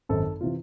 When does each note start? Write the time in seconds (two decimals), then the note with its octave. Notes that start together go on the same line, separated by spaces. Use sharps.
0.09 G#1 F#2 D#3 A4
0.41 C3 E3 F4